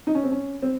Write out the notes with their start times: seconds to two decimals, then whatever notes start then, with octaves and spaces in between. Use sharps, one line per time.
0.07 D#4
0.15 C#4
0.24 C4
0.32 C#4
0.62 C4